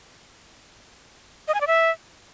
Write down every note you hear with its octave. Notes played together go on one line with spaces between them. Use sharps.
D#5
G#5
D5
E5